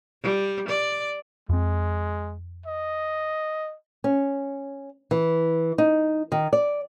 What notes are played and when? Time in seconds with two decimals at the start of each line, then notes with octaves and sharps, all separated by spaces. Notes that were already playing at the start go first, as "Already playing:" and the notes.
0.23 G3
0.69 D5
1.49 F2 G#3 C4
2.66 D#5
4.04 C#4
5.11 E3
5.78 D#4
6.32 D#3
6.53 D5